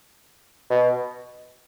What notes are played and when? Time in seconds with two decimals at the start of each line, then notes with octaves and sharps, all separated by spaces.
0.70 B2